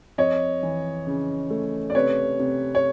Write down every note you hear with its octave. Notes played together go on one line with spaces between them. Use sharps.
F2 C#5 D#5
E3
C#3
A3
D5
C3 B4 C#5
C3
C#5